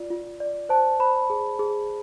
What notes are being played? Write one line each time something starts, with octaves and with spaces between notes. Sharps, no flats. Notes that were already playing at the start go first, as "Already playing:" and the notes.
Already playing: F4 D5
F4
D5
C5 A5
C5 B5
G#4
G#4